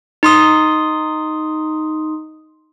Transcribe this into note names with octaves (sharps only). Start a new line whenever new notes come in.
D#4 C6 D#6